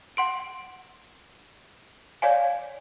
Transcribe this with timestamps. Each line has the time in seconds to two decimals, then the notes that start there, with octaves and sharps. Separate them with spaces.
0.17 F#5 C6 D7
2.22 C#5 D5 F5 G#5